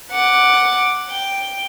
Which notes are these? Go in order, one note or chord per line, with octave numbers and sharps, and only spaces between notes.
F#5 D6
G5